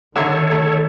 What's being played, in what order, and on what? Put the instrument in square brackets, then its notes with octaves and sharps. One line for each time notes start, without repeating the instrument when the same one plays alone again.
[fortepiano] D3 E5 A#5 [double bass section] D#3 [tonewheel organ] A4 C#5
[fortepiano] A3